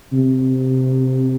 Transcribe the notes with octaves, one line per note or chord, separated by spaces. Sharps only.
C3